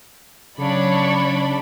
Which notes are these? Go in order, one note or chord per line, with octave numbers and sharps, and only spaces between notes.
C#3 F#3 D4 C#5 D5 B5